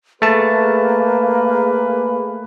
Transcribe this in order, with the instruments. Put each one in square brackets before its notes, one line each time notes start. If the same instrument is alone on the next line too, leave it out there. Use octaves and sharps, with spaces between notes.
[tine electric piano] A3 A5 [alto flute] A#3 [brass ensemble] G#4 B4